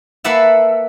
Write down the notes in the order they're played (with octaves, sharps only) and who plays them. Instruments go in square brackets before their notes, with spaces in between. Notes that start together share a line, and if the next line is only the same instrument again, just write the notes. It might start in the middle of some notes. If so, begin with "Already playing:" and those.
[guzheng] A#3 A4 B4 E5 F#5 A5